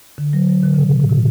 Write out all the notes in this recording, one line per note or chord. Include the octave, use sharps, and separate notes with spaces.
D3
F#3
F#3
D3
C#3
B2
A2
B2